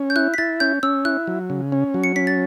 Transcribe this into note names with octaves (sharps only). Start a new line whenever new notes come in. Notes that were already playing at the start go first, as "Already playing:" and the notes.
Already playing: C#4
G6
E4 F#6
B6
E4 A6
C#4 G6
C#4 E6
E4 F#6
F#3
C#3
C#4
F#3
C#7
C#4 B6
A6